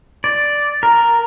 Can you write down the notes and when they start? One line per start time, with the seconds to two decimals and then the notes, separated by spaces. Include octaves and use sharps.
0.24 D5
0.83 A#4